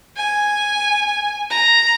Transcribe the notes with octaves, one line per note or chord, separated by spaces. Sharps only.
G#5
A#5